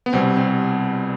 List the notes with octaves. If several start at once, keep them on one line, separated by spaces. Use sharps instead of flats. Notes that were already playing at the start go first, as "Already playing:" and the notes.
B3
C2 B2 G3 C4
C4